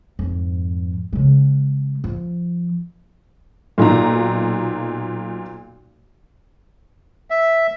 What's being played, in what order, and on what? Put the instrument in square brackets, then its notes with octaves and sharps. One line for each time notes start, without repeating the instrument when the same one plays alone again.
[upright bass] F2 G#2
C#3 G#3
F3
[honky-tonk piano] B1 A#2 D#4 A#5
[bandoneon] E5